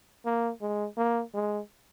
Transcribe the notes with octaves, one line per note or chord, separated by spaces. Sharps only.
A#3
G#3
A#3
G#3